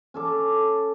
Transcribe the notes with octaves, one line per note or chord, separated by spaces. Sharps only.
C#4 A4 D6